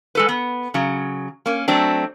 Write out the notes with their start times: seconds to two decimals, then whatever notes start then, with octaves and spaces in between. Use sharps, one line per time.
0.15 G#3 A4 B4
0.29 B3
0.74 C#3 F#3
1.46 A#3 C#4
1.68 F#3 A3 C4 D4